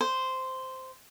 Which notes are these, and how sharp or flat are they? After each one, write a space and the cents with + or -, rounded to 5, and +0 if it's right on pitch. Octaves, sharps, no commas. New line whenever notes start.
C5 -10